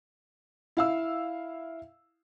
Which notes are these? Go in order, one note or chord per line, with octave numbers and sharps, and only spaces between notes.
E4 F5 E6